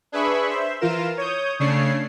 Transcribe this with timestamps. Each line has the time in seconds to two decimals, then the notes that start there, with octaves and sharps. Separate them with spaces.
0.12 D4 G#4 B4 E5 B5 C#6
0.49 C5 E5
0.80 E3 F4 A#4 E7
1.18 C#5 D#6 G6
1.59 C#3 A3 D4 C#5 C7